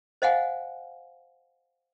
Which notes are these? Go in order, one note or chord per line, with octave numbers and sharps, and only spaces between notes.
C5 D#5 F5 F#5 G#5